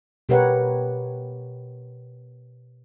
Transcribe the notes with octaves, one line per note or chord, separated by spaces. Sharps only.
B2 G4 A#4 B4 C#5 F#5